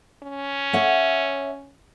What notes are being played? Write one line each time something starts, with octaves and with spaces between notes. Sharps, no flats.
C#4
C#5 E5 F#5